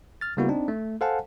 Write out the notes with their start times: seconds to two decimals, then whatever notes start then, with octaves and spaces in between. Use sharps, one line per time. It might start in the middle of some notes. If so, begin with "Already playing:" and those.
0.21 F6 A6
0.37 C#3 G3 A#3 B3 E4 F#4
0.49 C4 D4 D#4
0.68 A3
1.01 A4 C5 F5 F#5 G#5 A5